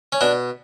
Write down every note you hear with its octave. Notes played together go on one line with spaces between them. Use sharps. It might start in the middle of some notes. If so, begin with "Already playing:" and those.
C#4
B2 D4